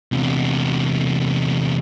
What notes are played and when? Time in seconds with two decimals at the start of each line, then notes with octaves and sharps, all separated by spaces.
0.12 E2 C3